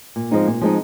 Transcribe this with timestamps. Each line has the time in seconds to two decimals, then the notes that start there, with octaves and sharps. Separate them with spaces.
0.16 A#2
0.31 F3 G#3 C4 D#4
0.47 A#2
0.61 F3 G#3 C4 D#4